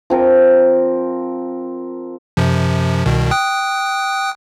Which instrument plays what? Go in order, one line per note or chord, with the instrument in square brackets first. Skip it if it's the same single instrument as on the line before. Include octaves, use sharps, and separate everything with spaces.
[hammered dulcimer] F3 C4 A#4
[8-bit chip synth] F#2 C3 F3
C2 B2 D#3
G5 D#6 F#6